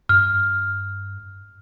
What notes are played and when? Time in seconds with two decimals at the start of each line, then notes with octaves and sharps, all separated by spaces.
0.09 G2 F6